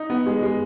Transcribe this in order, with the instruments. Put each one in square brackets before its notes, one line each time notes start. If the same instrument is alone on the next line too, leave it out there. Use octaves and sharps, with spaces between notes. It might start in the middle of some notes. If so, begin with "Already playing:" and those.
Already playing: [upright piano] D#4
B3
G#3
G#3